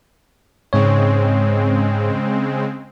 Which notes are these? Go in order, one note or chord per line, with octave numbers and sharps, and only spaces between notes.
G#2 C#3 G#3 C4 C#5